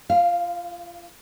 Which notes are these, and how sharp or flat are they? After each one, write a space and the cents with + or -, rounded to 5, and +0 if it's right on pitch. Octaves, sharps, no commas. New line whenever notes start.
F4 -30 F5 +0